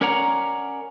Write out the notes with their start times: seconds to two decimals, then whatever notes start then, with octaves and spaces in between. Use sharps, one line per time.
0.01 C#4 A#4 C#5 D5 F#5 A#5